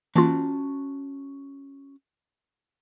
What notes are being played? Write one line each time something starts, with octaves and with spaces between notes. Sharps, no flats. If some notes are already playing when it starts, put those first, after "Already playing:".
E3 A#3 C#4 F4 F#4 A5